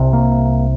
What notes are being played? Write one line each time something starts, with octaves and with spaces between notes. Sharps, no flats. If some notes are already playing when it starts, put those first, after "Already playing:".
Already playing: C2 C3
A#3